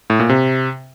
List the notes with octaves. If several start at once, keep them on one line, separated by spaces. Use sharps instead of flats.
A2
A#2
C3